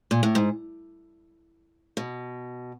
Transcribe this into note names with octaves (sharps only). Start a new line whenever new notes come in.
A#2
A2
G#2
B2